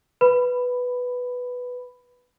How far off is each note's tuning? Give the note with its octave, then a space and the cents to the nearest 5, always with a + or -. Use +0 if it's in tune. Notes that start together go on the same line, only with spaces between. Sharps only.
B4 +0 B5 +10